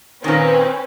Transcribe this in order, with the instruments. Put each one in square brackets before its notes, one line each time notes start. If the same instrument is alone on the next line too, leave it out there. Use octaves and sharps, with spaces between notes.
[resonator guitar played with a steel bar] A#2 D#3 [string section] C4 C#4 B4